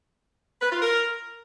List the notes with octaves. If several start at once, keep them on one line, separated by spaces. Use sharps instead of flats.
B4
F4
A#4